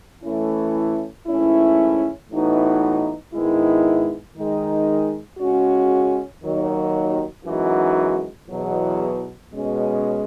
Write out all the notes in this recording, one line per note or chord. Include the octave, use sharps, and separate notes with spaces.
A2 E3 A3 C#4 E4
G#2 E3 A3 C#4 E4
A2 E3 B3 D#4 F#4
G#2 D#3 G#3 B3 E4
D#3 G#3 D#4
C#3 G#3 C#4 F#4
D#2 D#3 F#3
F#2 E3 G#3 D#4 F#4
E2 B2 F#3
B2 G#3 C#4